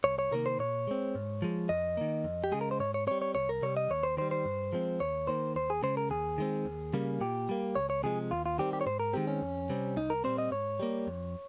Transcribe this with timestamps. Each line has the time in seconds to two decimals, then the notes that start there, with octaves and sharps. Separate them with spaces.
0.04 C2 C#5
0.19 C#5
0.32 C3 D#3 A#3 A#4
0.46 C5
0.59 A#2 C#5
0.87 G#3 C4
1.15 G#2
1.42 F3 G#3
1.69 F2 D#5
1.97 D#3 A#3
2.24 F2
2.44 G4
2.52 C#3 G#3 G#4
2.61 A#4
2.71 C5
2.80 G#2 C#5
2.94 C#5
3.07 G3 C4 C#5
3.22 C#5
3.35 C2 C#5
3.49 A#4
3.62 C3 G3 C#5
3.77 D#5
3.90 D#2 C#5
4.03 C5
4.17 D#3 G3 C5
4.31 C5
4.45 G2
4.73 F3 G#3 C4
5.00 D#2 C#5
5.27 D#3 A#3 C5
5.56 D#2 C5
5.70 G#4
5.83 C#3 G#3 C5
5.97 A#4
6.10 D#2 G#4
6.38 D#3 G#3 C4
6.65 D#2
6.93 C#3 G3 A#3
7.21 A#2 G4
7.49 G3 A#3
7.75 C#2 C#5
7.90 C#5
8.03 C3 F3 G#3 G#4
8.31 D#2 F4
8.46 F4
8.58 D#3 G3 C4 G4
8.73 G4
8.81 C#5
8.86 G#2 C5
9.00 A#4
9.13 D#3 G#3 C4 G4
9.27 C#4
9.42 F2
9.69 C3 G3 C4
9.97 C2 D#4
10.10 A#4
10.24 A#2 G3 C4 C5
10.38 D#5
10.51 G#2 C#5
10.80 G3 A#3
11.07 F2